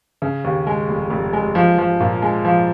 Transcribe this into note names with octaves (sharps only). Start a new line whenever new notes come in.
C#3
D#2
G#3
F1
F1
G#3
F3
F3
A#2
G#3
F3